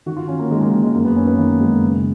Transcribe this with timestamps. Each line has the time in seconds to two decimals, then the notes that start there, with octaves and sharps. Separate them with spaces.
0.06 D#3 F#4
0.17 F4
0.28 D#3 C#4
0.39 A#3
0.50 D#3 G#3
0.61 A#3
0.72 D#3 A#3
0.83 G#3
0.94 F#2 A#3
1.05 B3
1.16 F#2 C#4
1.27 B3
1.38 D#3 A#3
1.60 F#2 G#3
1.82 C#3